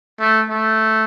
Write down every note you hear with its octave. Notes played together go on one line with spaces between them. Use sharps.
A3
A3